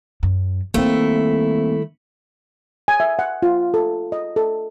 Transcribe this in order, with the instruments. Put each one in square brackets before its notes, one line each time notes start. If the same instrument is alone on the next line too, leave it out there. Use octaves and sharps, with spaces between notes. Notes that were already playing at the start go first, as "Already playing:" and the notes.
[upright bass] F#2
[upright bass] D#3 G3 [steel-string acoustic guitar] A3 E4 [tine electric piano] A#3 C4
[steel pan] G#5
E5
F#5
F4
A4
D#5
A4